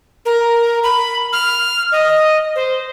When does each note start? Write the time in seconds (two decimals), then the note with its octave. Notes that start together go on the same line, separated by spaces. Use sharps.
0.26 A#4
0.83 B5
1.33 F6
1.92 D#5
2.56 C5